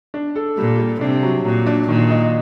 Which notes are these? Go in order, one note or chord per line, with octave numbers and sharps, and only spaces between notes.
D4
A4
A#2 G3
G3
C3 D4
F#3
A#2 F#3
D4
A#2 D#3
D#4